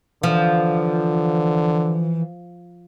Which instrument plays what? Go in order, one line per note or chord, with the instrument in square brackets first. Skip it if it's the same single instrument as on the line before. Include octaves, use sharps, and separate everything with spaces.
[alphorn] D3 [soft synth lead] E3 [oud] F3